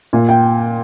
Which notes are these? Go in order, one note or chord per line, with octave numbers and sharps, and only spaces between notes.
A#2
G5